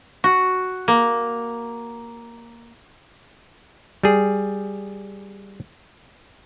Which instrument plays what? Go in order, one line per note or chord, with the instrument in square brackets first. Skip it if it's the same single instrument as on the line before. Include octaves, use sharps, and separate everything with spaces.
[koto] F#4
A#3
[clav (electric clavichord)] G3 G#4